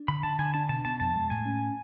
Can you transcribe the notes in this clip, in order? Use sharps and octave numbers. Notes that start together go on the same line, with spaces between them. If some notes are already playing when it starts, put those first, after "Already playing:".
Already playing: D4
D3 B5
D3 A5
D3 G#5
D4 A5
B2 A5
B2 A5
F2 A5
G#3
A2 G#5
C#4